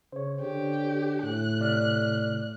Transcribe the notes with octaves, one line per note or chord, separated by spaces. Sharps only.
C#3 C5 C#5
D3 G4
A2 F#6
C3 D5 F6